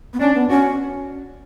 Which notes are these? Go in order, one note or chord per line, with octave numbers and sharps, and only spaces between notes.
B3
C#4 D4
B3
C#4 F#4